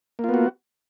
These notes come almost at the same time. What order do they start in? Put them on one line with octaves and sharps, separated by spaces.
A#3 F4 B3 F#4